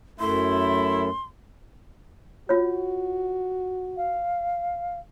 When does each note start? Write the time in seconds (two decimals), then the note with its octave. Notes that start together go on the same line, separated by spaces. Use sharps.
0.19 F#2 A3 E4 C6
2.49 F4 F#4 C#5
3.97 F5